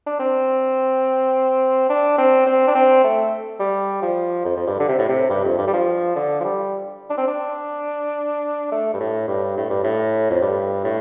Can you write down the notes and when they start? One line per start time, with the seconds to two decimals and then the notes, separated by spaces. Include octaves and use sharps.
0.06 D4
0.19 C4
1.90 D4
2.18 C4
2.46 C4
2.68 D4
2.75 C4
3.04 A3
3.60 G3
4.02 F3
4.45 F2
4.56 F2
4.67 G2
4.80 D3
4.89 C3
4.99 A2
5.09 C3
5.30 G2
5.44 F2
5.58 G2
5.68 G3
5.73 F3
6.16 D3
6.40 F3
6.44 G3
7.10 D4
7.18 C4
7.27 D4
8.72 A3
8.94 G2
9.00 A2
9.28 G2
9.57 A2
9.70 G2
9.84 A2
10.30 F2
10.41 G2
10.84 A2